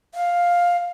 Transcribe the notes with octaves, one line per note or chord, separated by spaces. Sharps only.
F5